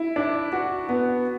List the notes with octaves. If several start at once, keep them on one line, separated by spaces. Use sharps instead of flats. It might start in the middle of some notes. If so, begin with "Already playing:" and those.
Already playing: E4
D4
F#4
B3